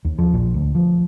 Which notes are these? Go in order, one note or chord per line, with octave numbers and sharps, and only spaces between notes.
D#2
F3
A#1
D2
F3